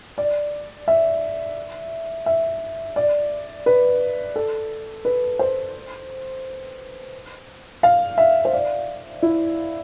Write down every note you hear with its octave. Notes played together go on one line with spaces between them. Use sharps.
D5
E5
E5
D5
B4
A4
B4
C5
F5
E5
C5
D5
E4